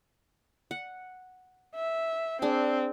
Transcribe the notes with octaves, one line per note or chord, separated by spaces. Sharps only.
F#5
E5
C4 D4 G#4